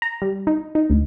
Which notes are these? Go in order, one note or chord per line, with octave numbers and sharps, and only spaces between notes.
A#5
G3
D#4
D#4
D2